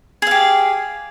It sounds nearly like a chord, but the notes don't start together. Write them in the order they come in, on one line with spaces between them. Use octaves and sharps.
G#4 F5 G4